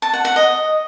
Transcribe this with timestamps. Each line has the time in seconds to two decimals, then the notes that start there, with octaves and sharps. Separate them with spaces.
0.02 A5
0.13 F#5
0.25 F#5
0.36 D#5